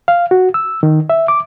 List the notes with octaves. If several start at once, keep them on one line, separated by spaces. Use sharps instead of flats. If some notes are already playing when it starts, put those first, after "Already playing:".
F5
F#4
E6
D#3
E5
D6